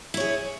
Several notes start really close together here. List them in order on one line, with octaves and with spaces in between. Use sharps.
E4 C#5 G#4